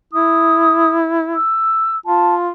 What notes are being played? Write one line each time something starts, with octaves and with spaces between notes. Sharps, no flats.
E4 D#6
E6
F4 A5